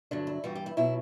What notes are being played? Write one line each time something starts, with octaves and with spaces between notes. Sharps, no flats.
G2 D3 F#3 D4
E4
G2 E3 G3 F#4
G4
E4
B2 F#3 E4